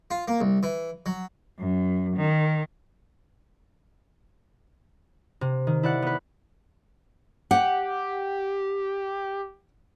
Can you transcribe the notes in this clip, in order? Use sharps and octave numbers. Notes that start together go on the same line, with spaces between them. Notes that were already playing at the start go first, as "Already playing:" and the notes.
F4
A#3
C2
E3
F#3
F#2
D#3
C3
D#3
E4 D5 F#5
B3 B4
G4 F#5